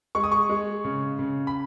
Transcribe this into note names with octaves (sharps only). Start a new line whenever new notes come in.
G#3 C#6
D#6
C#6
G#3
C#3
C#3
B5